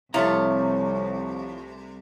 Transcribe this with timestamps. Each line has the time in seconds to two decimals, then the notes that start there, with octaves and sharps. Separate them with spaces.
0.14 C2 C3 F3 A3 E4 C#5 F5 A#5